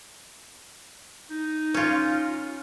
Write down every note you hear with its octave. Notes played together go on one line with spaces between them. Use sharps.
D#4
C#4 F4